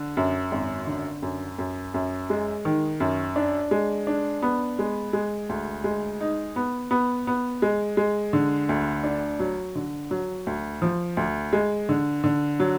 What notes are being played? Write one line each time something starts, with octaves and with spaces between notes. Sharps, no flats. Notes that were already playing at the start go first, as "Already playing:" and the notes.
Already playing: D3
F#2
G#1
D3
F#2
F#2
F#2
G#3
D#3
F#2
D4
G#3
D4
B3
G#3
G#3
D2
G#3
D#4
B3
B3
B3
G#3
G#3
D3
D2
D4
F#3
D3
F#3
D2
F3
D2
G#3
D3
D3
F#3